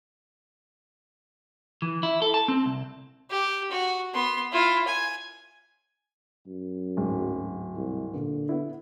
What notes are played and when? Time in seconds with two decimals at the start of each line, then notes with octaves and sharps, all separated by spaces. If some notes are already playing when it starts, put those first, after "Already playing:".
1.82 E3
2.03 E4
2.22 A4
2.34 A5
2.48 C4
2.66 C2
3.30 G4
3.71 F#4
4.13 B3 C6
4.51 E4 F4
4.87 G#5
6.47 F#2
6.97 D1 G#2
7.76 C2
8.14 A#2 D3
8.49 B3 E4